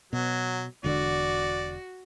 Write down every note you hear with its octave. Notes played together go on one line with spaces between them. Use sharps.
B2 F#3
E1 D3 F#4 D5